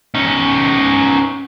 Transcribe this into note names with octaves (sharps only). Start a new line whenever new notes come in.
C#4 D#4